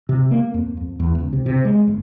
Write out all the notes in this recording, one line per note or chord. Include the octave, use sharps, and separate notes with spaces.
C3
A#3
F2
F2
E2
C#2
C3
C3
G#3
G1